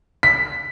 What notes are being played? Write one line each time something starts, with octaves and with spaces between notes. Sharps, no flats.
B6